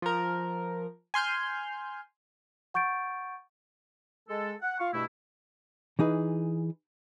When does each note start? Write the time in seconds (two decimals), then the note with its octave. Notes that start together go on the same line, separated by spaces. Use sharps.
0.02 F3 A#4
1.14 G#5 C6 F6 G6
2.74 F#5 C#6 G6 A6 D7
4.29 G#3 A4
4.61 F#5
4.80 F4 F5 C#6
4.93 G2 B2 A3 E4
5.99 E3 D#4 G#4 B4